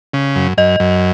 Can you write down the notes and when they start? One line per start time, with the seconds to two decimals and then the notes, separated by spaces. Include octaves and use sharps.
0.14 C#3
0.36 F#2
0.58 F#2 D#5
0.80 F#2